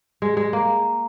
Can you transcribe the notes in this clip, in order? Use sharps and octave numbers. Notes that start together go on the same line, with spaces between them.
G#3
G#3
A#3